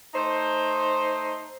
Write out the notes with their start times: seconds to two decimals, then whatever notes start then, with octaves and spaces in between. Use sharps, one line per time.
0.14 A3 D#4 C5